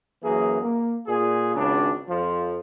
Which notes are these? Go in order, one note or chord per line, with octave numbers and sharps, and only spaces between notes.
F#2 E3 A#3 G#4
A#3
A#2 G#4
G#1 C#2 C#3 D4
F2 F3